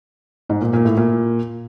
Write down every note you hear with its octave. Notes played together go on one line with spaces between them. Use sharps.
G#2
A#2
A#2
A2
A#2